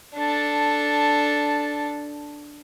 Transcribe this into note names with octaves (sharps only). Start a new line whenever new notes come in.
D4 A4